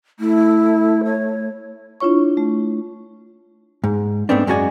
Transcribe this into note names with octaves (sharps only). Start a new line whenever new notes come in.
A3 E4
C#5
D4 E4 F4 C#5 C#6
A3
G#2
G#2 A3 B3 C4 D4
F#2 G#3 C#4 F#4 D5 G#5